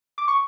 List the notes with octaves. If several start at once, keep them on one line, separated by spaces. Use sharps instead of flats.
D6
C#6